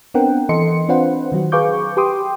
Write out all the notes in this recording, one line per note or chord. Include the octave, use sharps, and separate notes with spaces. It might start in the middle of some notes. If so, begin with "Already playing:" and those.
B3 C4 D4 A#4 F#5 G5
E3 A4 D#5 C6 C#7
C4 D4 F4 B4 C5 F#5
D#3 F#3 F#4
G#4 B4 F5 C#6 D6 G6
G4 B4 G5 C6 D6 D#6